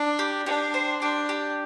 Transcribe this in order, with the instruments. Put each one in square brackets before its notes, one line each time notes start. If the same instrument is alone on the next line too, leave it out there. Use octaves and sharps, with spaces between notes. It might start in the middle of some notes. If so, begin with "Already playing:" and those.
Already playing: [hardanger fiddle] D4
[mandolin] G4
[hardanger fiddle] D4 [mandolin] G4
[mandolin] C5
[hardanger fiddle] D4 [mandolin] G4
[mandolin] G4